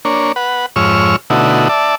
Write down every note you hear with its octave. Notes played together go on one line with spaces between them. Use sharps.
A#3 D4 C#5
B4 F#5
F2 G#2 C#5 C#6 E6 F6
B2 D3 A3 D#4 E4 F#4
D5 E5 A5